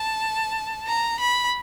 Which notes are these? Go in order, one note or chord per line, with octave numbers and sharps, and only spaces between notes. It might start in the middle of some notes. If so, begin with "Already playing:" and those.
Already playing: A5
A#5
B5